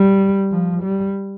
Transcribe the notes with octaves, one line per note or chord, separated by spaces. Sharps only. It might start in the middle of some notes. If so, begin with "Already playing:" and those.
Already playing: G3
F3
G3